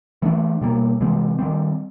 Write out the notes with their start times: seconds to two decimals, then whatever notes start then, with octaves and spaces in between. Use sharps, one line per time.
0.22 E3 A3 D4
0.61 B2 G3 A#3
1.01 C3 E3 G#3 C4
1.39 D#3 G3 C4